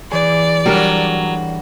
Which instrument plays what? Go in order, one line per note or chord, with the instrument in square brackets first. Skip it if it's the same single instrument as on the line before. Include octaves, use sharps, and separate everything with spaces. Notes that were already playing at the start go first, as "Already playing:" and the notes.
[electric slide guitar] E3 G#4 [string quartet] D5
[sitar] F#3 [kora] G3 D4 A#4